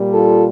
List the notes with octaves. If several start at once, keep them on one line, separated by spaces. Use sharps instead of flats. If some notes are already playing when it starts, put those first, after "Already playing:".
Already playing: A#2 G3
F4 A4